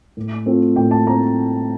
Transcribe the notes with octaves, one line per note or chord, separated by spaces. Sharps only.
A2
A3 C4 F4
A2 G5
A5
A3 C4 A#5